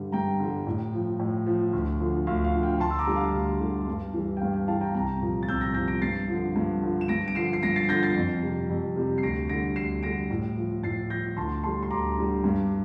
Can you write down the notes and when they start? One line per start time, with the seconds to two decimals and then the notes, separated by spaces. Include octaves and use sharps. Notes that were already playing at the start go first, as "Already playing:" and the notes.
Already playing: G2 D3 G3
0.12 G2 G5 A#5
0.40 D3 G3
0.67 A2
0.93 F3
1.20 A2
1.46 F3
1.73 D2
2.00 D3 F3
2.27 D2 F5
2.44 F5
2.54 D3 F3
2.63 G5
2.80 D2 A5 C6
2.90 E6
2.99 A#5 D6
3.07 D3 G3
3.16 F5
3.34 D2
3.60 D3 G3
3.88 G2
4.14 E3 G3
4.37 G5
4.41 G2 F5
4.54 G5
4.68 E3 G3 F5 A5
4.81 G5 A#5
4.94 C2 G5 A#5
5.21 A#2 F3
5.43 A6
5.48 C2 E6 G6
5.61 G6 A#6
5.74 A#2 F3 G6 A#6
5.88 A#6 D7
6.02 G2 A6 C7
6.28 D3 F3
6.56 G2
6.82 D3 F3
7.01 E7
7.08 G2 A#6 D7
7.28 D7
7.35 D3 F3 C7 E7
7.53 C7
7.63 G2 A#6 D7
7.76 A6 C7
7.89 D3 F3 G6 A#6
8.03 A6 C7
8.15 F2
8.42 C3 G3
8.70 F2
8.96 C3 G3
9.18 C7
9.23 D2 A#6 D7
9.49 D3 G3 A#6 D7
9.76 D2 C7 E7
10.03 D3 G3 A#6 D7
10.31 A2
10.57 F3
10.83 A2 A6 C7
11.10 F3 G6 A#6
11.37 D2 A5 C6
11.63 D3 G3 A5 C6
11.83 C6
11.91 D2 A#5 D6
12.17 D3 G3
12.44 G2